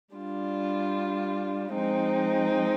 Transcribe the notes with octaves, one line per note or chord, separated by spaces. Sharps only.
G3 D4 F4
F3 G#3 C4 D#4